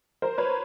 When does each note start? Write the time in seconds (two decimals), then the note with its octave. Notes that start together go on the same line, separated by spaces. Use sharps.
0.22 A#4 C5
0.38 B4 C#5